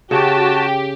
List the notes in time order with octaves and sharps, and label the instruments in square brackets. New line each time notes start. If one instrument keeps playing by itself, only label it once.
[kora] C#3 [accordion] F#4 A5 [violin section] G4